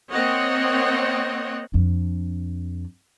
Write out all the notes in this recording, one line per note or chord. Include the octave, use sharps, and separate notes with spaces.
A#3 C4 C#5 D#5 F#5
F2 D4